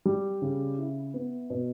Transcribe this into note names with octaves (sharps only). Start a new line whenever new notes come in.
G3
C#3
E4
B3
B2